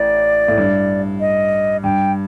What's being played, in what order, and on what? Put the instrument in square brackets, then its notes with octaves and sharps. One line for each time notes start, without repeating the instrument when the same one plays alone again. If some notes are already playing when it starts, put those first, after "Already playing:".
Already playing: [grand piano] A1 A2 [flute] D5
[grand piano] A2
G2
[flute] D#5
[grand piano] G2 [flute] G5